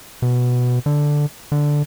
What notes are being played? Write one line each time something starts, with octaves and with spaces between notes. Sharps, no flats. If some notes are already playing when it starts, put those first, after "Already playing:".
B2
D3
D3